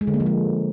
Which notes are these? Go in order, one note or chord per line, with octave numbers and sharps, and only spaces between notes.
G#3
D3
A#3
F3
G#3